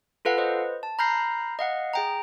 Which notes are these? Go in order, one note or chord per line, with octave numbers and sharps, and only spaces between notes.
F4 A4 B4 F5 F#5
B4 C5 D#5
A5
A#5 B5 F6 G6 A#6 C7
D#5 F5 F#5
G#4 G5 A#5